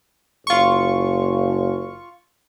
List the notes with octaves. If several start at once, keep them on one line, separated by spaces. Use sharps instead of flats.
F#1 F4 C#6